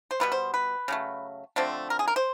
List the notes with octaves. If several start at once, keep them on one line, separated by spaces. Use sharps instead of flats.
C5
B2 G3 B3 B4
C5
B4
C#3 F#3 A3
D3 F3 A3 C4
A#4
G#4
A#4
C5